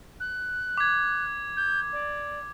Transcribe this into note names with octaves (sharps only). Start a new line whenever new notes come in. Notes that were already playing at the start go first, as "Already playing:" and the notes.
F#6
D6 G#6
G6
D5